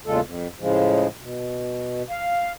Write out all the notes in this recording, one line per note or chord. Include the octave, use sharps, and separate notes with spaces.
E2 A#2 C#3 G#3 F4 A4
F2
A2 C#3 F3 G#3
B2
F5